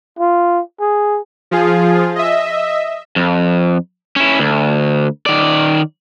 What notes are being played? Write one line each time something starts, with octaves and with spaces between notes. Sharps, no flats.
F4
G#4
F3 F4 G#4
D#5 E5
F2
C#4 E4
D2
D#3 D5